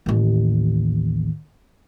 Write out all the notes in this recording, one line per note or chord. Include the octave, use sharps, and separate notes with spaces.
A1 D#2